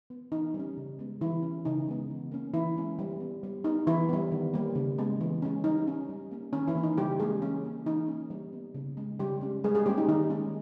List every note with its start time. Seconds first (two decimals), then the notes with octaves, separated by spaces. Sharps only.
0.10 B3
0.32 E3 D#4
0.54 G3
0.59 C#4
0.77 C#3
0.99 G#3 B3
1.21 E3 G3 E4
1.43 C#4
1.65 C#3 D#4
1.88 G#3 B3
2.10 E3
2.32 A#3 C#4
2.54 E3 E4
2.77 G#3 C#4
2.99 G3
3.20 B3
3.43 G3
3.64 B3 D#4
3.87 E3 E4
4.09 G3 B3
4.32 D#3
4.54 G3 A#3
4.75 C#3
4.98 G#3 B3
5.21 E3
5.42 G#3 C#4
5.64 G3 D#4
5.87 C#4
6.09 G3
6.31 A#3 C#4
6.53 D#3 C#4
6.68 E3 E4
6.75 A#3 C#4
6.83 D#4
6.97 C#3 G3 G4
7.20 G3 G#3 A#3 C#4 G#4
7.42 E3 C#4
7.64 A#3 C#4
7.86 E3 D#4
8.08 A#3 C#4
8.30 G3
8.52 B3
8.74 C#3
8.97 G#3 C#4
9.19 C#3 G3 G4
9.41 G#3 C#4
9.64 G3 G#3 G#4
9.75 G#3 G#4
9.86 G3 A#3 C#4 G4
9.98 D#4
10.08 D#3 D#4
10.30 G#3 C#4